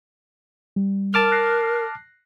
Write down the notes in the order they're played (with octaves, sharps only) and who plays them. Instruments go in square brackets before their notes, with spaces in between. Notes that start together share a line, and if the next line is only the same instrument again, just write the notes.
[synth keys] G3
[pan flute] A#4 [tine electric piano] A5 D6 F6
[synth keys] F#6 A#6 C7